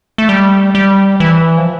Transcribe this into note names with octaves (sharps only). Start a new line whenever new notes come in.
A3
G3
G3
E3
F3